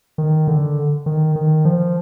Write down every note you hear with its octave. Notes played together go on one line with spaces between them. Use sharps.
D#3
D3
D#3
D#3
F3